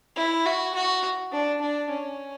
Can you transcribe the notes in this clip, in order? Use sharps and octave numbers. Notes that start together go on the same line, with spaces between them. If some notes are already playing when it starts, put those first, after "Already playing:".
E4
F#4
F#4
D4
D4
C#4